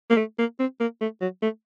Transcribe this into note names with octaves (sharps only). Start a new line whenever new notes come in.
A#3
A3
A#3
C4
A#3
A3
F#3
A3